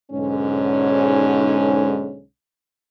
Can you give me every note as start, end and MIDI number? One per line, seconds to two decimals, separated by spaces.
0.12 2.23 35
0.12 2.23 44
0.12 2.23 50
0.12 2.23 61